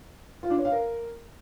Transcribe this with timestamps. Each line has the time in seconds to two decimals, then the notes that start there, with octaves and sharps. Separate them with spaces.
0.43 F4
0.50 D4
0.57 C#5
0.65 F5
0.72 A#4